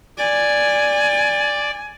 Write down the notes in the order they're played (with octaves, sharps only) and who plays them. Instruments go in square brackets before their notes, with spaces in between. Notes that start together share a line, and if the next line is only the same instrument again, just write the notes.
[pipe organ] D5 [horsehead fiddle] G#5